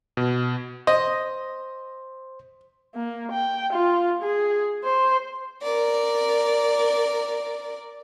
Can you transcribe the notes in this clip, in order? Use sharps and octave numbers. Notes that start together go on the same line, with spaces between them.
B2
C5 D#5
A#3
G5
F4
G#4
C5
A#4 D5